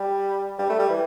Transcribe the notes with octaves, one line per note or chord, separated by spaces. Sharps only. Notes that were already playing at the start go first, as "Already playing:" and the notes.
Already playing: G3
G3
A3
G3
E3